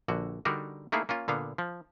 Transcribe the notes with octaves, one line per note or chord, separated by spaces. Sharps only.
A#1 D3 F#4
D3 G3 D4 D#4 F#4 A#4
A3 A#3 D#4 E4 G#4 F5
A#3 C#4 F4
A#2 D3 B3 F5
F3